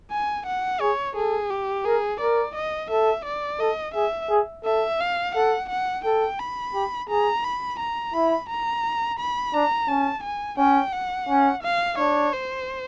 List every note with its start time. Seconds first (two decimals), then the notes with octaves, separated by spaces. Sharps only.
0.11 G#5
0.46 F#5
0.81 G#4 C#5
1.15 G#4 A4
1.50 G4
1.85 G#4 A#4
2.20 A#4 D5
2.55 D#5
2.90 A4 E5
3.25 D5
3.60 A4 D#5
3.94 G#4 E5
4.30 G#4
4.64 A4 E5
5.00 F5
5.35 A4 F#5
5.69 F#5
6.05 A4 G5
6.39 B5
6.74 G4
7.09 G#4 A#5
7.44 B5
7.79 A#5
8.14 E4 B5
8.49 A#5
9.19 B5
9.54 D4 A#5
9.88 C#4 A5
10.24 G#5
10.58 C#4 G5
10.93 F#5
11.29 C#4
11.63 F5
11.98 D4 C#5
12.33 C5